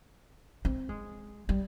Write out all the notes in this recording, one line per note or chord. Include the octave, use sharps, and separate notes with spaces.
C4
G#3
G3